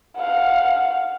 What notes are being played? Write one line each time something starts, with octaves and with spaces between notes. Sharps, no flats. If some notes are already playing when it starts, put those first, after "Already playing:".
F5 F#5